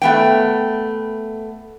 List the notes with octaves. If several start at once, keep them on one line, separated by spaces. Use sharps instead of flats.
A3 B3 G5